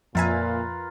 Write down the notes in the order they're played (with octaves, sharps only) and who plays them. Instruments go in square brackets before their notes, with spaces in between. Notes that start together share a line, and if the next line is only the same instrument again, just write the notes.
[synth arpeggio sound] F2 E5 G#5 [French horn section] A#2 [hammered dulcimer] F4 A#4 B4